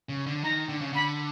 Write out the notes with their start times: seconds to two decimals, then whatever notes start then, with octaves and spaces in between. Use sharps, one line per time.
0.09 C#3
0.26 D3
0.43 D#3 A#5
0.69 D3
0.81 C#3
0.93 D3 B5